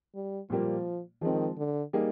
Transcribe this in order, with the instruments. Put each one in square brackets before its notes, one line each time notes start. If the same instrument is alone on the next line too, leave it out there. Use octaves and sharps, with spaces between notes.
[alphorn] G3
[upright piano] A#2 G3 A#3 [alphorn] F3
[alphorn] D#3 [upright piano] F3 G#3 C4
[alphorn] D3
[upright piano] G3 A#3 D#4 G#4